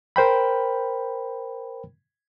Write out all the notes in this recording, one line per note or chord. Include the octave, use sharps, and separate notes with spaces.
A#4 C5 G5 B5